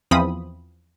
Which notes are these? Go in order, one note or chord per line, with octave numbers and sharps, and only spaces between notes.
E2 F3 C4 B5 D#6